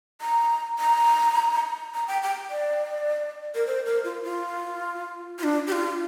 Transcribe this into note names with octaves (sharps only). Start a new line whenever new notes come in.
A#5
A#5
A#5
G5
G5
D5
A#4
C5
A#4
F4
F4
F4
D4
G4
F4